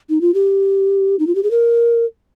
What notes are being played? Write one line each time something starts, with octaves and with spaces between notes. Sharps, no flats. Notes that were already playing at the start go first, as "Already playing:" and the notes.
D#4
F4
G4
D#4
F4
G4
G#4
A#4